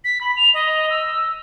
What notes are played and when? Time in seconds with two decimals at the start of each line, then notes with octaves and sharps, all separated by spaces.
0.04 B6
0.21 B5
0.37 F7
0.54 D#5
0.90 E6